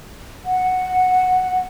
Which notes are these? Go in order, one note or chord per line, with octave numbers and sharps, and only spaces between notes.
F#5